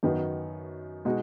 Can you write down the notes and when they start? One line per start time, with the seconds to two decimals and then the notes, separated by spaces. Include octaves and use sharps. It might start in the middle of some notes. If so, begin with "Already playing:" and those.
0.03 F#2 D#3 B3 D#4 F#4
1.05 B2 G#3 D#4 F#4